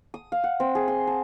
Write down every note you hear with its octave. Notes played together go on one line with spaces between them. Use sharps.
D#6
F5
F#5
C4
G#4
C6
A5